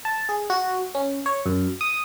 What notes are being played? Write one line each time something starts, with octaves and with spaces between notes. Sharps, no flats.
A5
G#4
F#4
C#4
C#5
F#2
D#6